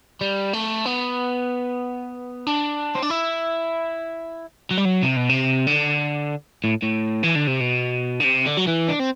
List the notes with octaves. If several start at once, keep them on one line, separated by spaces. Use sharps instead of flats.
G3
A3
B3
D4
C4
D4
E4
F#3
G3
F#3
C3
B2
C3
D3
A2
A2
E3
D3
C3
B2
D3
C3
D3
F#3
E3
D4
C4